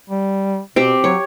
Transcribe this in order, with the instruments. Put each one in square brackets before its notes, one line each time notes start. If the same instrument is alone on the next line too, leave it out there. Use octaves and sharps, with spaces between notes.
[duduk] G3
[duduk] B2 [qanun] C4 G4
[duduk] F#3 [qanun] C#5